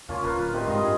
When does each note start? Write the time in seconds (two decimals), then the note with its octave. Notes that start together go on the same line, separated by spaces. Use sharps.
0.09 C#2 A#3 C#4 F4
0.24 D1 F4 A#4 B4
0.53 C3 D#3 C6
0.67 G#2 F4 D#5
0.83 G2 G#4